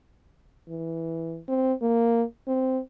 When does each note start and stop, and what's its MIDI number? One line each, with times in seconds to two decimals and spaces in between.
0.68 1.40 52
1.48 1.73 60
1.82 2.23 58
2.48 2.80 60